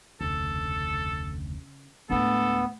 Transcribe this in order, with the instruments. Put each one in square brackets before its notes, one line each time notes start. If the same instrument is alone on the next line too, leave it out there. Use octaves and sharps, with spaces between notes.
[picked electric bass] F1 D2 [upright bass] C#3 [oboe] A4
[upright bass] D2 A2 [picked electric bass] G#3 D4 [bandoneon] B3 [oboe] A4